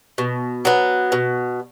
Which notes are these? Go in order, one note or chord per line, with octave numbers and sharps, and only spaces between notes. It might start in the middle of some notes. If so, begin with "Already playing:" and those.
B2
F#3 B3
B2